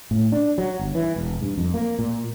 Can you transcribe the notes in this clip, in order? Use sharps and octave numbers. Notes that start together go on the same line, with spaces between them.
A2
D4
F#3
G1
E3
E1
G2
F2
A#3
A#2